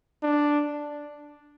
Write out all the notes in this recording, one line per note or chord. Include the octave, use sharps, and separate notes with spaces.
D4